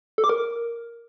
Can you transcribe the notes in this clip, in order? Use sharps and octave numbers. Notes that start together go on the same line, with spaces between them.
A4
D6
A#4